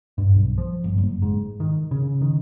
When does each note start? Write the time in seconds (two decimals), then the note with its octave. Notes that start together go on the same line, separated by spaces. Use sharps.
0.18 G2
0.35 B1
0.58 F3
0.84 G1
0.98 F#1
1.22 G#2
1.60 D#3
1.91 C#3
2.22 D#3